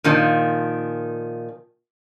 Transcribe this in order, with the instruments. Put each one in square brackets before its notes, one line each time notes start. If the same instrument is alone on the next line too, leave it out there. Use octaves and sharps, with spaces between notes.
[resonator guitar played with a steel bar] A#2 D#3 F3